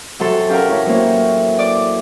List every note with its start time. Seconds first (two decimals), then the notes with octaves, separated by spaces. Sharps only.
0.20 C3 F#3 A4 G5 C6
0.49 C#4 G4 A#4 F5 F#5
0.69 A2 E3 C#5
0.86 F#3 A#3 C4
1.59 D5 D6